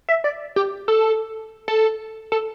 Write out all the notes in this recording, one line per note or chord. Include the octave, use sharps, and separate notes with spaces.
E5
D5
G4
A4
A4
A4